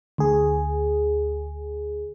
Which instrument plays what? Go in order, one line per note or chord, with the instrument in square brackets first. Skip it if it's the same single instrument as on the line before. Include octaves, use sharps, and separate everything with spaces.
[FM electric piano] D2 G#4